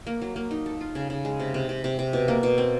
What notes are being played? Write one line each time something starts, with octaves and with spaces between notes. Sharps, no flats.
A#3
F#3
A#3
D#4
A4
F4
C#3
C#3
G#3
C3
C3
C3
C3
C3
B2
A#3
B2
C4